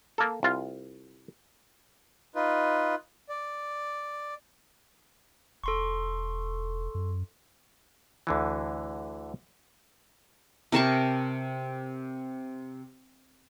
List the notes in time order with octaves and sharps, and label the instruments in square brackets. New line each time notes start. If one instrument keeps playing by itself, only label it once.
[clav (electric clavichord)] A#3 A4
C2 F4 F5
[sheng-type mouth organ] D#4 F4 B4
D5
[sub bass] E1 [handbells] A4 C6 C#6
[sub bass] F#2
[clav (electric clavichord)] D2 D3 E3
[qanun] C3 A#4 A5 C#6